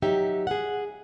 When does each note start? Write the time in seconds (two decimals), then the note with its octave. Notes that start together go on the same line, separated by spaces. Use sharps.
0.02 F#3 D#4 G4 E5
0.47 G#4 F#5